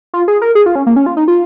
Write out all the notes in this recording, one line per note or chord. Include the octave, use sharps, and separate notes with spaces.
F4
G#4
A#4
G#4
F4
C#4
A#3
C#4
F4
D#4
F4